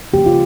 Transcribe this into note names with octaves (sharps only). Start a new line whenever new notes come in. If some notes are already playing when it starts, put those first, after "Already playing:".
C#3 F3 A#3 G4
F4